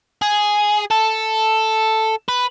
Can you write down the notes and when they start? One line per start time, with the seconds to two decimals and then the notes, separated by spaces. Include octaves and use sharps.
0.22 G#4
0.91 A4
2.28 B4